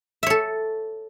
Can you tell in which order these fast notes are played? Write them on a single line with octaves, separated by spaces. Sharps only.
E5 C#5 A4